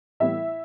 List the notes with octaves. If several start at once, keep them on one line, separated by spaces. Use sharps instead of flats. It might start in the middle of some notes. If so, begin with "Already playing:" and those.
A2 E3 G3 B3 E4 E5